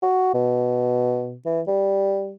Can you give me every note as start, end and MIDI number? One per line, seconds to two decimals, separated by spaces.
0.02 0.30 66
0.34 1.36 47
1.46 1.61 52
1.67 2.33 55